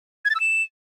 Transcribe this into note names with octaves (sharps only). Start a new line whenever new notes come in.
G#6
A6
E6
E7